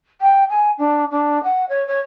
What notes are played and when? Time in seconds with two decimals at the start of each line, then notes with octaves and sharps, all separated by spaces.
0.21 G5
0.49 G#5
0.78 D4
1.11 D4
1.44 F#5
1.69 C#5
1.88 C#5